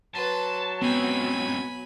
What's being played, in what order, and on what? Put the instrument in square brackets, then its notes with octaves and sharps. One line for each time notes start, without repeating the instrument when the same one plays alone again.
[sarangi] F#3 [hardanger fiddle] B4 C6 [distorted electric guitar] A5
[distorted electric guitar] C#2 C4 [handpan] B3 [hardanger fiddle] G#5 B5